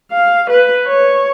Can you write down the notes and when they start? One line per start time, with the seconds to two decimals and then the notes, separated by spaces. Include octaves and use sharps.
0.12 F5
0.50 B4
0.87 C#5